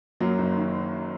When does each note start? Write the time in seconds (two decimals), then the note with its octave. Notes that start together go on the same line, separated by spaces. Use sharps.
0.20 F#2 F#3 A#3
0.38 F#1
0.56 D#3